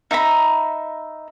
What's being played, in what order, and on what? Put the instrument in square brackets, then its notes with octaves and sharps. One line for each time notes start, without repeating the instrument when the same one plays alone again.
[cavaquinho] D#4 E5 A#5 B5